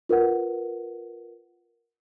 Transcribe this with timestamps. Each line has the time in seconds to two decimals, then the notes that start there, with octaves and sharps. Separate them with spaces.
0.09 F4 A#4 B4 F#5